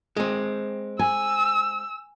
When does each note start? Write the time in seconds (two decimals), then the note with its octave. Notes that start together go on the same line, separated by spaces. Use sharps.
0.16 G#3 C4
0.99 G#5 E6